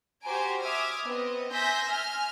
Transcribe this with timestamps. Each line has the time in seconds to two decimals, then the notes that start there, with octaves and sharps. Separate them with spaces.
0.23 F#4 G4 C5 G#5 A#5 D7
0.62 E5 D6 D#6 F6 G#6
1.05 B3 C4 D#5
1.52 E5 G#5 C6 G6 A#6 B6
1.89 G#5 F6